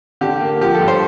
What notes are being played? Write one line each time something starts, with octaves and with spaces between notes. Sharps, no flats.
D3 G4
A#3
F3 G4
A4
G2
C5